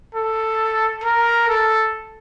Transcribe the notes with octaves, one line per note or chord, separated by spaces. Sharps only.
A4
A#4
A4